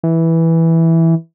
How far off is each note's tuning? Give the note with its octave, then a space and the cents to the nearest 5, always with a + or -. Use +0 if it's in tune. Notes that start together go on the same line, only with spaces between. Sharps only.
E3 -5